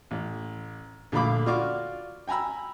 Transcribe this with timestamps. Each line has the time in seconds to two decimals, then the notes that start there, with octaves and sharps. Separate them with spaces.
0.11 A1
1.12 A#1 D3 A3 F5 B5 D6
1.46 F4 F#4 D5 C#6 D6 F6
2.28 G5 G#5 A#5 B5 E6